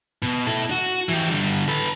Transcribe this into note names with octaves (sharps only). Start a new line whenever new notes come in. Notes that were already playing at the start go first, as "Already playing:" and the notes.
B2
E4 A4
F#4
E3 G4
D3 G3
A4 B4